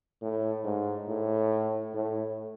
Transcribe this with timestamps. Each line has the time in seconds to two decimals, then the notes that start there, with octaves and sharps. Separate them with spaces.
0.22 A2
0.65 G#2
1.08 A2
1.94 A2